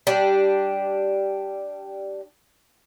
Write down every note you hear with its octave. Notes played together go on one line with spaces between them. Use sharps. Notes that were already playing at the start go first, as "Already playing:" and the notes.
G3 D4